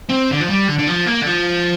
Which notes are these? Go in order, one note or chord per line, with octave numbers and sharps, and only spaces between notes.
C4
D3
F3
G3
D3
D3
F3
A#3
D3
F3